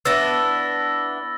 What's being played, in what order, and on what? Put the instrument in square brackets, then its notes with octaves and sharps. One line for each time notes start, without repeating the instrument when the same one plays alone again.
[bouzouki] B3 D4 E4 [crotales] E6 A6 A#6